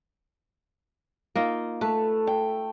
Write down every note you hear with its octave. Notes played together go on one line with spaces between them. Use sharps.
A#3 D#4 F4
A3 B4
G5